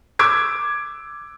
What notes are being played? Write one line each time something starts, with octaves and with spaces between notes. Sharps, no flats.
D6 E6 G#6 D7